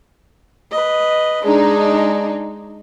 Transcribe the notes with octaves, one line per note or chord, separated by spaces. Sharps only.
B4 D#5
G#3 D4 D#4 G#4